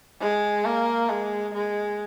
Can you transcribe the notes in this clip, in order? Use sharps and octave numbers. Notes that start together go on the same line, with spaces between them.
G#3
A#3
G#3
G#3